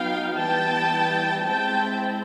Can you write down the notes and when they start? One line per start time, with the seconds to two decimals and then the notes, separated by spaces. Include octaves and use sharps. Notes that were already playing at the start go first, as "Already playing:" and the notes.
Already playing: F#3 B3 D#4 F5 G5
0.37 E3 G3 B3 G5 A5
1.46 G#3 C4 E4 G5 A5